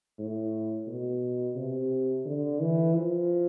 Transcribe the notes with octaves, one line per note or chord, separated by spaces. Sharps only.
A2
B2
C3
D3
E3
F3